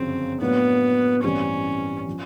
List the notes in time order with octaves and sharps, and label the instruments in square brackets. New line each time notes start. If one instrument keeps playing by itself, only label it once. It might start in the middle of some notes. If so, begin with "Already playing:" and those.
Already playing: [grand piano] G1 F#2 C#3 F3 [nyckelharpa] C4
[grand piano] A2 F#3 A#3 D4 [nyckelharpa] B3
[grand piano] A1 G2 E3 G3 C4 [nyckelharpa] C#4
[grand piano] F3